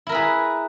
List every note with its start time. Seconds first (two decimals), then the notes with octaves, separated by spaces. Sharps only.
0.07 E4
0.09 A#4
0.12 B4
0.15 G#4